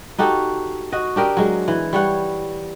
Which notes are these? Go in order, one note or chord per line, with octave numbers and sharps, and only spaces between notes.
D#4 F#4 G4 A4
F#4 D#5
D4 G4 A#4 D#5
F#3 G#3
E3
G3 C#5 F#5